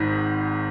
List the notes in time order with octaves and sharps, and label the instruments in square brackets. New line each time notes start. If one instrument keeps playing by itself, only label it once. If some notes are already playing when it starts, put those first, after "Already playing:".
Already playing: [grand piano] G#1 G#2 D#3